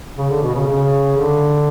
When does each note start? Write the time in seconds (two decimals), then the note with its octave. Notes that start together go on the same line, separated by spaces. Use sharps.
0.18 C#3
0.30 D3
0.42 B2
0.54 C#3
0.67 C#3
1.17 D3